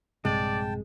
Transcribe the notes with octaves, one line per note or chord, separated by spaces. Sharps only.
A#1 G2 C3 G#3 D5 G5 A5